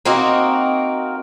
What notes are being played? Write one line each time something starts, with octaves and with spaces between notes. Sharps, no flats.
A#3 C4 D#4 F#4